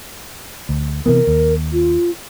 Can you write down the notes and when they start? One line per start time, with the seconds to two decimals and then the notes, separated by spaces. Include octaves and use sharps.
0.69 D2
1.06 C3 E3 B3 A#4
1.27 D#2
1.73 F4